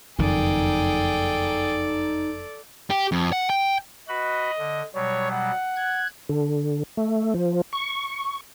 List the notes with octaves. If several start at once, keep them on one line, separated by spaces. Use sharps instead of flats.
F#1 F2 D#3 D#4 G#4 A4 D5 G5
G4
F2
F#5
G5
F#4 B4 D#5 B5
D3
B2 F#3 G3 C#5
F#5
F#6 G#6
D3
A3
F3
C#6